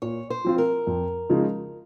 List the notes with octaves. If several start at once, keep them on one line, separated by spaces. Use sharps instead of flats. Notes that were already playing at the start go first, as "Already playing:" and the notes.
A#2 C#5
C5
F3 C4 F4
A#4
F2
C#3 F3 G#3 D#4